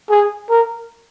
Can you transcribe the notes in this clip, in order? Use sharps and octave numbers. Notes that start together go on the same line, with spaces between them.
G#4
A#4